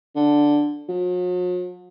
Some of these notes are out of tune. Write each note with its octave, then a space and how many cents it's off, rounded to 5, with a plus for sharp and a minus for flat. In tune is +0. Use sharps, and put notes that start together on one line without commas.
D3 +0
F#3 -45